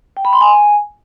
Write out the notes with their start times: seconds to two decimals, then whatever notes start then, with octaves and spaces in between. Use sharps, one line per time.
0.17 G5
0.25 B5
0.33 C6
0.41 G#5